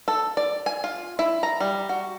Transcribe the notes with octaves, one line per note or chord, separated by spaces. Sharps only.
A4
D5
G#5
F4
E4
A#5
G3
F#4